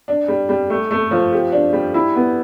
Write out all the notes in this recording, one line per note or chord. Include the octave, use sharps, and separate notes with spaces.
D4
G3
G3
A3
A3
F3
G4
D4
G3
E4
B3